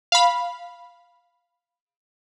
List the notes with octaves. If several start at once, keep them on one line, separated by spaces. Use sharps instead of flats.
F5 B5